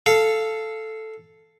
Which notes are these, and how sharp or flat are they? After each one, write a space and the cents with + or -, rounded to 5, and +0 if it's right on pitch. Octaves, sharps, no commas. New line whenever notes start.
A4 +0 F5 -10